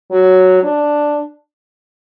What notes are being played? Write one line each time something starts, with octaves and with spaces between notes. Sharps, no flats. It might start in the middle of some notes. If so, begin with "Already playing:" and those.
F#3
D4